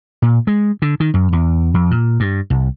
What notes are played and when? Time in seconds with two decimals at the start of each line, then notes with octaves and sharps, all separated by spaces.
0.22 A#2
0.47 G#3
0.82 D3
1.00 D#3
1.14 F#2
1.33 E2
1.74 F2
1.91 A#2
2.20 G2
2.50 C2